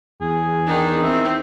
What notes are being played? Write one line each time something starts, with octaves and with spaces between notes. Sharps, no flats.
E2 G#4
D#3 D4 D#4
C4 E5